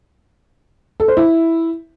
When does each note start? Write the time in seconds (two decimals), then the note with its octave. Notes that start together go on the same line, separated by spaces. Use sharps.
1.00 A4
1.08 C5
1.17 E4